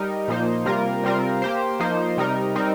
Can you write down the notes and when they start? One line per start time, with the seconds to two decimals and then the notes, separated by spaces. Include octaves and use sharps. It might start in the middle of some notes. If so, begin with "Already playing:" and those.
Already playing: G3 D#4 A#4
0.28 A#2 F3 A#3 D#4 C5
0.65 C3 G3 A#3 F4 A#4
1.03 C3 G3 C4 F4 A#4
1.42 A#3 G4 C5
1.80 F3 A#3 D#4 C5
2.17 C3 G3 D#4 A#4
2.56 G3 C4 D#4 A#4